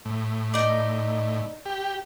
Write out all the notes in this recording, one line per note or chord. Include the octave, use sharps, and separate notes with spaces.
A2
D#4 D5
G4